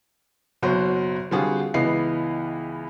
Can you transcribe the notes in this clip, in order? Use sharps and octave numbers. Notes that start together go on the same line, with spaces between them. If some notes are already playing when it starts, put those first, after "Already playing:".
F#1 B2 F#3 F#4 C5
D3 G3 C4 F4 F#4 G#4
C#2 E3 B3 D#5 C7